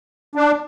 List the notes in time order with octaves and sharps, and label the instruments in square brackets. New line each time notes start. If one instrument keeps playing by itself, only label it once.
[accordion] D4